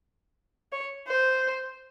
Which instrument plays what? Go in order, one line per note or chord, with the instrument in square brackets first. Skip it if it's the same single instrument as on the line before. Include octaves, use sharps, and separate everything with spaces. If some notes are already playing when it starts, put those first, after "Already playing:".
[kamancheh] C#5
C5